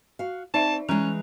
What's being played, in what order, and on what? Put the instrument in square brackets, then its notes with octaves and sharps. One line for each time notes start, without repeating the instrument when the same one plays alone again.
[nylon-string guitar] F#4 F5
[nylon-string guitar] C4 [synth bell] D#4 D5 E5 [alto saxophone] A5
[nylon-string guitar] E3 G#3 [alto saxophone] C#4 [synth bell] A#5 F#6 F7